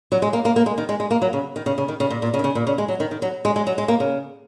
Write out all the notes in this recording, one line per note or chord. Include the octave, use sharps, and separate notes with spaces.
F#3
G#3
A#3
A#3
A#3
G#3
D#3
G#3
G#3
A#3
F#3
C#3
D#3
C#3
C#3
D#3
C#3
A#2
A#2
C#3
D#3
C#3
A#2
C#3
G#3
F#3
D#3
D#3
F#3
G#3
G#3
F#3
G#3
A#3
C#3